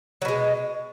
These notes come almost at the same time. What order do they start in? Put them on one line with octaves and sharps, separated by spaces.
F#3 B2 G#3